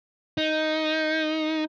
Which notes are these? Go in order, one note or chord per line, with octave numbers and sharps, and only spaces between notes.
D#4